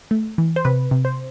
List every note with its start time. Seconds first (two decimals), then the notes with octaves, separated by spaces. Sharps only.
0.11 A3
0.38 E3
0.56 C5
0.65 C3 B4
0.91 C3
1.05 C5